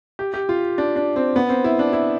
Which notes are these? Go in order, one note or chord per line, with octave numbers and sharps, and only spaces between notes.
G4
G4
F4
D4
D4
C4
B3
C4
E4
D4
E4